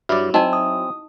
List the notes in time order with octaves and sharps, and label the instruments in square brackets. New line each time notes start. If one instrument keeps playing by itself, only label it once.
[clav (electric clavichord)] G2 D5 [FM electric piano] F#3 E4
[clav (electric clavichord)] C4 G#5 [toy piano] D#4 D#5 A5
[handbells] D#6